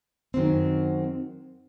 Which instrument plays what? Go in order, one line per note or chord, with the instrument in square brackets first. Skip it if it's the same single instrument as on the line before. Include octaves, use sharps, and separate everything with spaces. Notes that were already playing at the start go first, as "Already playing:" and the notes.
[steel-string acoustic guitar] F#2 D#3 F#3 C4